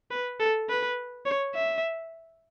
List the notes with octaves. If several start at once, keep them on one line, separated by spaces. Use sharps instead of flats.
B4
A4
B4
C#5
E5